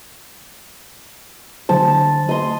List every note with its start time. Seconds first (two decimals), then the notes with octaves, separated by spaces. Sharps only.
1.69 D3 F#3 C5 A5
2.29 D#5 C6